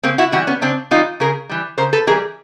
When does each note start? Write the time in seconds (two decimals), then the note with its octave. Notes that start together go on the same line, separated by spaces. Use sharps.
0.03 C#3 A#3 C4
0.18 E4 F#4
0.32 E3 G3 E4 F#4
0.47 B3 C#4
0.61 C#3 C4 D4
0.91 E3 G3 D#4 F4
1.20 C#3 G#4 A#4
1.49 E3 G3
1.78 C#3 A#4 C5
1.93 A4 B4
2.07 E3 G#4 A#4
2.10 G3